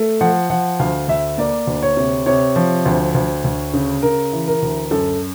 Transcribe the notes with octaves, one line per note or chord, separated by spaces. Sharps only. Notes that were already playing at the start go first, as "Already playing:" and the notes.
Already playing: A3
F3 F#5
F3 F#5
D2 F5
D2 E5
A#3 D5
D2
C#5
C3
C3 C#5
F3
D2
D2
D2
C#3
C#3 A#4
E3
A#4
D2
F#2 A4